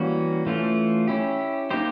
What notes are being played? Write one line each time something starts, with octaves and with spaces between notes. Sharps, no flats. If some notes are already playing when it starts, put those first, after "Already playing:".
Already playing: E3 G3 A#3 C#4 F#4
E3 A3 C#4 F4
C#4 E4 G4
A#3 D#4 G4 C5